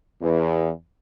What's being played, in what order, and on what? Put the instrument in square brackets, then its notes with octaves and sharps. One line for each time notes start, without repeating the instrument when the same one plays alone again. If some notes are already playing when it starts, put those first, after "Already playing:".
[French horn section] E2